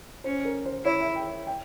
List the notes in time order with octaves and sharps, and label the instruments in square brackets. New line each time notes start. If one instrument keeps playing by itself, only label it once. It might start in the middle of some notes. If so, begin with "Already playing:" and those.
[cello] C#4 [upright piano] C5
[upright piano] A#4
C5
[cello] E4 [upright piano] C#5
[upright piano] E5
G5
G5